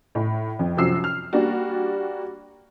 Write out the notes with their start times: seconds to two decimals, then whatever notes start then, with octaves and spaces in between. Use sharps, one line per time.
0.15 A2
0.59 F2
0.77 C2 F#2 F3 F#4 E6 C7
1.04 F6
1.33 G3 A#3 D4 F#4